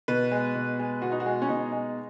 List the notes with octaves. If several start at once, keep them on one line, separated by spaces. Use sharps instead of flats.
B2 B4
G#3
B2
G#3
B2 F#4
D#4
F#4
G#3
C#4
B2 D#4
G#3